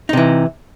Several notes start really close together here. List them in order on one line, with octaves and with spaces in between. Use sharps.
D#4 C3 E3